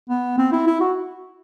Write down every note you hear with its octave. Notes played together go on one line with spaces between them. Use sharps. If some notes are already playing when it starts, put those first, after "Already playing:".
B3
C4
E4
E4
F#4